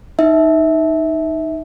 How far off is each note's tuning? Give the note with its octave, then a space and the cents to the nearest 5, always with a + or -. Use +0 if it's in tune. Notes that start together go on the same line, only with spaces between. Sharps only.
D#4 +0 E5 -20